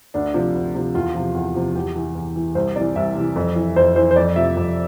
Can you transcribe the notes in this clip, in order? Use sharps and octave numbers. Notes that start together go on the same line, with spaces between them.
D2 D4
C3 F3
D2
C3 F3
E2 F4
C3 F3
E2
C3 F3
E2 G4
E3
E2
E3
C2 C5
C3 E3 D5
C2 E5
C3 E3
F2
E3
F2 C5
E3 C5
C5
F2 D5
C3 F3 E5
F2